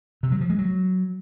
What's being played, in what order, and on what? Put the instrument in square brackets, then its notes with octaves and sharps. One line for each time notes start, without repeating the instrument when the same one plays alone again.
[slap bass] C3
F#3
F3
G#3
F#3